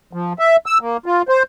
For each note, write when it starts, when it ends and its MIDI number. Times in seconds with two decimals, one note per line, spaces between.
0.13 0.33 53
0.39 0.56 76
0.66 0.78 88
0.81 0.97 58
1.06 1.22 65
1.29 1.43 72